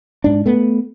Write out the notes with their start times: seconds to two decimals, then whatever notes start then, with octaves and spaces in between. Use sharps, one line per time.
0.24 G#2 D4
0.46 A3 B3